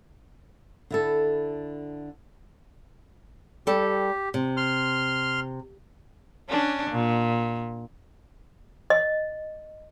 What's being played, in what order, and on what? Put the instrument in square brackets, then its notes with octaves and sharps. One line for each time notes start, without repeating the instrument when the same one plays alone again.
[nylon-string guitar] D3 E4 A4
[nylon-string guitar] G3 A4 [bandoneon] G4
[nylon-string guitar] C3
[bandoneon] C6 F6
[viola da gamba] C#4 D4
A#2
[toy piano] D#5